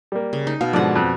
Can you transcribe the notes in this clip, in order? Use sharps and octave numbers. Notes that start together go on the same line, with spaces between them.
G3 A#3
C#3
D#4
B2 F5
G#2 D3 F3 D5 F#5
F2 F#6